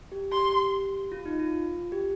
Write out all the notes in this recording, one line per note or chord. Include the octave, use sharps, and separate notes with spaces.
G4
G4 C6
F4
D#4
F4
G4